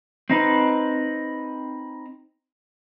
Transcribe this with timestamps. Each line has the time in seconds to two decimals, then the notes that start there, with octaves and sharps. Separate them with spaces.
0.30 C4 D#4 B4